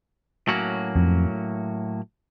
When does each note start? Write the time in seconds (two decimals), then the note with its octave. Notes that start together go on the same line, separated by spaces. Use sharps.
0.48 A2 F#3 A#3 C#4 F#4
0.96 F2